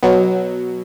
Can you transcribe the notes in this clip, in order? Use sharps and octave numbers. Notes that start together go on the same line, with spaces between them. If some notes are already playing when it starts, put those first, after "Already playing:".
B2 F#3